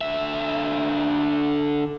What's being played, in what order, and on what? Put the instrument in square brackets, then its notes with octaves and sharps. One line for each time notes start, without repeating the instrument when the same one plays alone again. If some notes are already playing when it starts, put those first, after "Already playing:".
[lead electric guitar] D3 E5